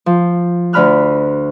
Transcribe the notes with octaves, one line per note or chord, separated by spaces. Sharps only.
F3
D2 D3 B5 F6 F#6